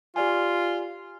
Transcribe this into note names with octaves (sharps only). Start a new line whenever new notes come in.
F4 G4 D5 G#5